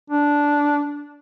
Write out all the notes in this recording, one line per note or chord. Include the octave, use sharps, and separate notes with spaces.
D4